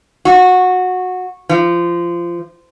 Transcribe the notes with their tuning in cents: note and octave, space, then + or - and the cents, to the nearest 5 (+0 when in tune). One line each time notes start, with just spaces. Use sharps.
F#4 -15
F3 -20